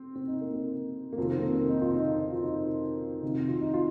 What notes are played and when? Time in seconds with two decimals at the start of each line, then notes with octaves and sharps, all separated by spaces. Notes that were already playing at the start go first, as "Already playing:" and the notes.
Already playing: C4
0.16 C4
0.28 D#4
0.41 A#3
0.54 C4
1.13 A#3
1.18 F2 C3 D#3 C4
1.31 A#3
1.38 C4
1.43 A#3
1.56 C4
1.69 D#4
1.82 F4
1.88 C4
1.95 D#4
2.20 D#4
2.32 F4
2.43 D#4
3.22 F2 C3 D#3 D#4
3.35 C4
3.48 F4
3.61 D#4
3.74 F4